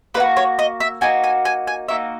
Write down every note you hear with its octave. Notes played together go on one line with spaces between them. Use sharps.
A#3 D#4 B4
F#4
C#5
D#5
E5
A#3 D#4 F#4 G#5
G#5
G#5
G#5
A#3 D#4 F#4 E5